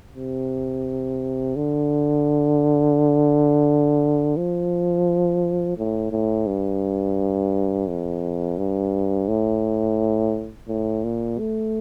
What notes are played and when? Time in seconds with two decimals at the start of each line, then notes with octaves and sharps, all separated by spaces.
0.15 C3
1.56 D3
4.37 F3
5.78 A2
6.12 A2
6.47 G2
7.88 F2
8.58 G2
9.28 A2
10.68 A2
11.04 A#2
11.39 A3